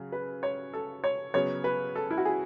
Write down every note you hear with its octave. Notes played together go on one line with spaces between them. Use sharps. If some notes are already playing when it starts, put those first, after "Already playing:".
Already playing: C#3 F#3
B4
C#5
A4
C#5
C#3 F#3 B3 C#5
B4
A4
E4
F#4
G#4